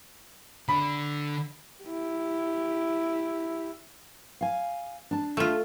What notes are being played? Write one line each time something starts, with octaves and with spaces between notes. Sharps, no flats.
D3 D4 B5
E4 G4
F5 G#5
D4 A5
A3 F4